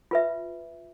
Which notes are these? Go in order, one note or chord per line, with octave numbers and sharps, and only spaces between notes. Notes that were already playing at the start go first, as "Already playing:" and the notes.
F4 B4 E5